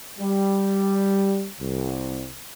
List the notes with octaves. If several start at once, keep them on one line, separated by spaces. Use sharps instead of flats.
G3
C2